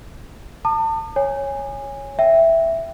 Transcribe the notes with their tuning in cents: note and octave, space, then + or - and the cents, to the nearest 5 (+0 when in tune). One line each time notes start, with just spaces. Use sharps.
A5 +30 D#6 -45
C#5 +0 G#5 -15
E5 +0 G5 +0